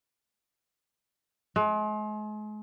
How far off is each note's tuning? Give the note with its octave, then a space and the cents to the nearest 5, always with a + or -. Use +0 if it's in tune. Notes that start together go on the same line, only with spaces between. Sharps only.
G#3 +40